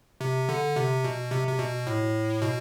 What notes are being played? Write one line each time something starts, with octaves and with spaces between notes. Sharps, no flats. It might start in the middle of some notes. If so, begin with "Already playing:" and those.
C3
D3
C3
B2
C3
C3
B2
A2
B2